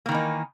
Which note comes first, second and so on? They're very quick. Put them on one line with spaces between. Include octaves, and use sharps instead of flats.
A#3 D#3 E3 D#4